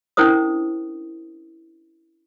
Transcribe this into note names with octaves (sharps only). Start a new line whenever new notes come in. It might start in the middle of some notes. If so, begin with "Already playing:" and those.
C#4 D4 E4 A#4 C5 D#6